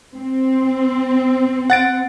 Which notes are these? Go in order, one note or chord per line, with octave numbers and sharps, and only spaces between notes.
C4
F#5 A6 D7